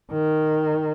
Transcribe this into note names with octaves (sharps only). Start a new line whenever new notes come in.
D#3